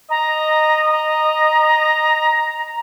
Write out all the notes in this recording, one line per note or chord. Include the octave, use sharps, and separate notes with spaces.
D#5 A#5
A#5